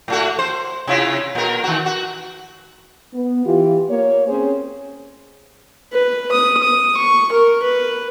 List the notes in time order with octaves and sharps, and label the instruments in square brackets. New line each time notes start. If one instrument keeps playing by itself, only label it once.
[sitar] A2 A3 F#4
C5
C3 E4 F4
A#2 A#4
D#3 F#4
F#4
[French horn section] B3
E3 F4 G4
A#3 C#5
C4 C#4 G#4 C5
[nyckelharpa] B4
D#6
D#6
C#6
A#4
B4